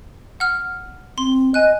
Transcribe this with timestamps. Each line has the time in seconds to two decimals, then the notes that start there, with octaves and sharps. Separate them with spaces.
0.40 F#5 F6
1.18 C4 C6
1.54 D#5 G#5 F#6